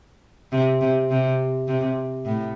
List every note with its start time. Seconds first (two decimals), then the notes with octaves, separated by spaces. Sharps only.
0.52 C3
0.81 C3
1.10 C3
1.68 C3
2.25 A2